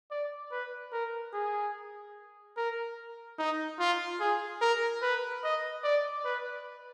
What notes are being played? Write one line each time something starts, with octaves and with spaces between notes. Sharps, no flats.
D5
B4
A#4
G#4
A#4
D#4
F4
G#4
A#4
B4
D#5
D5
B4